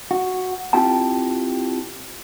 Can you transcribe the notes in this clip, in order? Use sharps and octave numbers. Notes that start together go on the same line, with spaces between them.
F#4
C4 E4 F4 G4 G5 A5